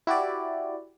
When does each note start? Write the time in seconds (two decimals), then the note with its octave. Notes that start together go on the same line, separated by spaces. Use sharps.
0.07 E4 F#4 G4 D5